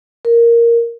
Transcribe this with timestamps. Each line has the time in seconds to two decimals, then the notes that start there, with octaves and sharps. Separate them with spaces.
0.25 A#4